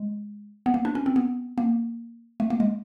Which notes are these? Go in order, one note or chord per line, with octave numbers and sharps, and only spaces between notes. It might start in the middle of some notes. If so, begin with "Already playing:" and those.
Already playing: G#3
B3
A#3
D4
C#4
C4
B3
A#3
A3
A#3
G#3